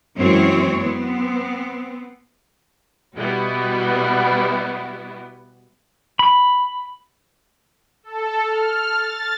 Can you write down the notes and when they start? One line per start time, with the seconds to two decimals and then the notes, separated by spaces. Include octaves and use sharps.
0.18 F#2 E3 G#3 A#3 C4 C#5
0.79 B3 C4
3.16 B2 G3 B3 E4 F#4
6.19 B5
8.03 A4
8.45 F6
8.92 A6